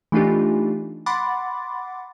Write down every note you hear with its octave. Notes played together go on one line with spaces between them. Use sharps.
E3 A3 D4 D#4 F4 G4
F#5 B5 C6 D6 A6